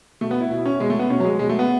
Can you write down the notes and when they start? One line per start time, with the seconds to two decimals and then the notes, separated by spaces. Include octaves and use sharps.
0.21 B2 A3
0.31 B3
0.40 E4
0.51 B2 E4
0.65 C#4
0.80 B2 G#3
0.90 A3
0.99 B3
1.10 B2 C#4
1.20 F#3
1.24 G#3
1.39 B2 G#3
1.49 A3
1.59 B3